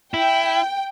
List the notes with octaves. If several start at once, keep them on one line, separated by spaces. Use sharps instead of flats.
E4 G5